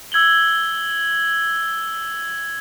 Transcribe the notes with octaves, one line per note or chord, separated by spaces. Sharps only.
E6 G#6 F#7 G7